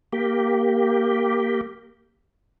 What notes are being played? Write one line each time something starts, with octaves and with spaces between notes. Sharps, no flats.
A#3 G4